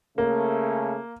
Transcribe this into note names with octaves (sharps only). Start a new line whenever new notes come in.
C#3 A3 A#3